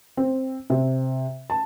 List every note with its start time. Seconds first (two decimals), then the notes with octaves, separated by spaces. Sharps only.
0.17 C4
0.70 C3
1.50 A5